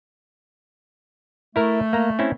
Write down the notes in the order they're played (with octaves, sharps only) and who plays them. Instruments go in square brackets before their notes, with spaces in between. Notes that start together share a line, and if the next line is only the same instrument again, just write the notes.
[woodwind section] A3 [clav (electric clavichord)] E4 A#4
[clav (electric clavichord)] A#3 A#5
C4 C#4 E4